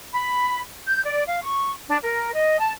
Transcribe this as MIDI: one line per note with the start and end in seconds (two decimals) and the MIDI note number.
0.14 0.61 83
0.87 1.01 91
1.06 1.24 74
1.27 1.42 77
1.43 1.71 85
1.87 1.96 62
2.02 2.30 70
2.34 2.56 75
2.59 2.71 81